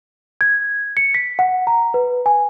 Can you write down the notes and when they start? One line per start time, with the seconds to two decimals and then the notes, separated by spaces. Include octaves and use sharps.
0.41 G#6
0.97 C#7
1.14 B6
1.39 F#5
1.67 A#5
1.94 B4
2.26 G#5